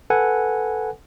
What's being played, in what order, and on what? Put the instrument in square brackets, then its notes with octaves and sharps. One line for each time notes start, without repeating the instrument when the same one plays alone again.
[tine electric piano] A4 B4 F#5 G#5